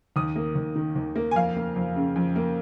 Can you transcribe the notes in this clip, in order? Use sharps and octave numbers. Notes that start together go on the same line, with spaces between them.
D#2 D#6
A#3
D#2
D#3
D#2
A#3
G#5
F2 F5
A#3
F2
C#3
F2
A#3